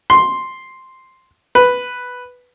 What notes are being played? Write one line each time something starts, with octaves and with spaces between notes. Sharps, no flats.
C6
B4